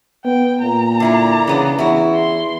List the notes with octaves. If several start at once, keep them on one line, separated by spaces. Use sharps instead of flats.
B3 G5
A#2 A#5
D3 E4 F4
C#3 E3 B3 D4
E2 E4 F#4
C6